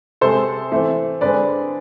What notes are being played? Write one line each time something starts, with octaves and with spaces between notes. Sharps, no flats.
C3 G#3 C4 A4 C5
E3 A3 C4
D3 G#3 C4 B4 D5